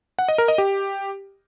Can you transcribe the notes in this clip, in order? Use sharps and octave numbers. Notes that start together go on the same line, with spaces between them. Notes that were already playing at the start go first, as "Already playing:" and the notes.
F#5
D#5
A#4
D#5
G4